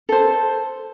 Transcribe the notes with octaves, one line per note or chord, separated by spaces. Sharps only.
A4 C5